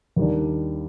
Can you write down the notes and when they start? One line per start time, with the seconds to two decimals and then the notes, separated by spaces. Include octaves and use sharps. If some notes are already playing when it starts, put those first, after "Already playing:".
0.16 D#2 D#3 G3 D4